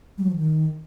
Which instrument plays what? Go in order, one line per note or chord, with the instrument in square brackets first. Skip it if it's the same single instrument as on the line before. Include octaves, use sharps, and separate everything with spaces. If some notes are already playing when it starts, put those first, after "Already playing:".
[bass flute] G3
F#3
F3
D#3